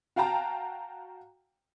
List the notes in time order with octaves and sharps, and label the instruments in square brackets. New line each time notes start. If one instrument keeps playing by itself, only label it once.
[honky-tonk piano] F#4 F5 G5 A5 A#5